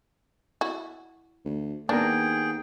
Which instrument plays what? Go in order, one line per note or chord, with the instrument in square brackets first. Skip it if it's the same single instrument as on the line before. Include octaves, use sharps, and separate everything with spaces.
[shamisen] E4 F#4
[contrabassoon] D2
[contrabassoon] D#2 [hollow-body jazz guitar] A#3 B3 A#4 [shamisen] D4 [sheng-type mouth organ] G#4 G5